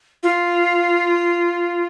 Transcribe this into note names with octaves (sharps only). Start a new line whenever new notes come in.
F4